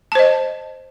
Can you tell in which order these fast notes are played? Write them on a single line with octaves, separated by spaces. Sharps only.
A5 C5 D#5